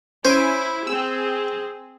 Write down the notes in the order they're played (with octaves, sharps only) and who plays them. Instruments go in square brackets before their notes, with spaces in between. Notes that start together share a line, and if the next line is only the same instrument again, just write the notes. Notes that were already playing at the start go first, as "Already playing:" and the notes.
[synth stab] C#4 G#5 D7 [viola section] E4 [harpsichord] C5
[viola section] C4 G#4 [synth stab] E6